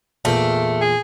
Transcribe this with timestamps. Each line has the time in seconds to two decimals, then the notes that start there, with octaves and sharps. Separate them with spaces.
0.25 E2 A#2 A3 G5
0.81 G#4